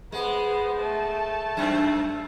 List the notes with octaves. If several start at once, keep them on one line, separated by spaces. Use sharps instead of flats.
G#3 B3 C5
A3 A5
F#2 C4